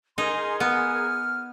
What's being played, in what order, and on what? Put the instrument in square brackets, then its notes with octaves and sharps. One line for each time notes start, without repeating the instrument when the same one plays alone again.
[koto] D#4 [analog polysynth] G#4 A#4 G#5 [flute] C6
[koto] B3 [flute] F6